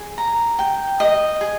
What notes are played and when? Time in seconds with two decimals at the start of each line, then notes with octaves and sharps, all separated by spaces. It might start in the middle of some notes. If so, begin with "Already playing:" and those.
Already playing: G#4
0.18 A#5
0.59 G5
1.00 D#5
1.41 G#4